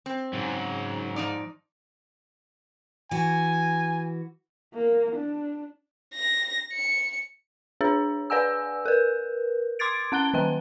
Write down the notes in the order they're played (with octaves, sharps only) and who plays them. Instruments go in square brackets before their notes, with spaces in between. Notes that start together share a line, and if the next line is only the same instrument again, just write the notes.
[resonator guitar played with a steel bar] C4
[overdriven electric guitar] G#2 [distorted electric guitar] C#3 F#3
[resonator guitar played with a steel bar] F3 D#4 D5
[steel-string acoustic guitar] E3 F#4 [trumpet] G#5
[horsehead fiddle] A#3
D4
[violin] A#6
C#7
[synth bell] D4 G#4 C#5
B4 D5 F#5 G#5 E6
A#4 B4
C6 D6 G#6 A6 D7
C#4 F#5 F#6 G7
D#3 G3 G5